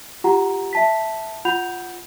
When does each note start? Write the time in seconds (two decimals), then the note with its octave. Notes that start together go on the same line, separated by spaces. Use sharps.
0.24 F4 G4 F#5 A#5
0.73 E5 A5 B6
1.45 F4 F#5 B5 G6 F7